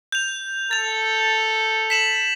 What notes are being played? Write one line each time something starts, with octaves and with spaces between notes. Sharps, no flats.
G6 F7
A4 A6 F7
B6 E7 F#7